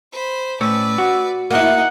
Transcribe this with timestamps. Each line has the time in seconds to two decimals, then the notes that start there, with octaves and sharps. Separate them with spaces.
0.12 C5 B5
0.61 A2 C#4 B4 D5 E6
0.98 F#4
1.50 A#3 D#4 E4 D#5 F#5